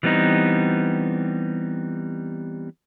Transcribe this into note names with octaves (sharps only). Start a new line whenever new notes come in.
E3 G3 B3 C4 D#4